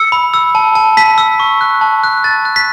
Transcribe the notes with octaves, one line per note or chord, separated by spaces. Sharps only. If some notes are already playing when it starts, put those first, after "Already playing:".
Already playing: E6 C#7
B5
E6
A5
A5
A5 B6
E6
C#6
F#6
A5
F#6
A5 A6
F#6
B6